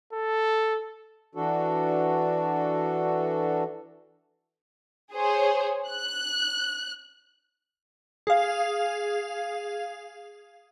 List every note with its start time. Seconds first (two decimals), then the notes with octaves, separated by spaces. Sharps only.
0.13 A4
1.35 E3 D4 F#4 A4
5.12 G#4 C5 C#5
5.88 F#6
8.27 G#4 F5